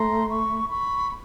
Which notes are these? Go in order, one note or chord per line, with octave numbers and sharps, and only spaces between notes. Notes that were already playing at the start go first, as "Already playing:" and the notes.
Already playing: A3 A#5 C6
B5 C#6
B5 C#6